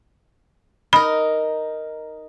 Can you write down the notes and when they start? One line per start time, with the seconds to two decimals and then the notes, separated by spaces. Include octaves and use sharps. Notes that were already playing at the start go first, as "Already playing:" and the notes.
0.93 D#4 A#4 B5